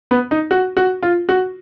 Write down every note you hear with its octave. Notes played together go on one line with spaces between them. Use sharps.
B3
D#4
F#4
F#4
F4
F#4